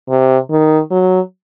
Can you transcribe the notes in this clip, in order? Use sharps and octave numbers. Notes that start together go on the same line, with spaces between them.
C3
D#3
F#3